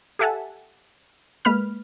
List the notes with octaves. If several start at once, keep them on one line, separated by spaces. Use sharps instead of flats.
G4 A4 E5 F#5 G#5 A5
G#3 A#3 B4 B5 F6